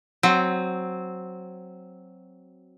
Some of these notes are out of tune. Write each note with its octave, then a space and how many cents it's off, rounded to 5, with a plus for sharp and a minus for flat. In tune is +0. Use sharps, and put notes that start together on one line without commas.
F#3 +0 C4 +0